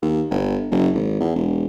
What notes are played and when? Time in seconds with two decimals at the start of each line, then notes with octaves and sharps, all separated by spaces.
0.02 D#2
0.31 G1
0.71 F#1
0.95 G#1
1.20 E2
1.35 E1